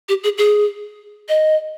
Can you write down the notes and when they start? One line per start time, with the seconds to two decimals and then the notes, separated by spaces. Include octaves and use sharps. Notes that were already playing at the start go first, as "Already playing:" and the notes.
0.09 G4
0.24 G#4
0.38 G#4
1.29 D#5